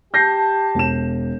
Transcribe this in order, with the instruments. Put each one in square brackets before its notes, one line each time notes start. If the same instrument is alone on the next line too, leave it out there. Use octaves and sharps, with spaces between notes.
[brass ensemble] G4 A5 [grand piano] G6 A#6 C7
[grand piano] E1 E7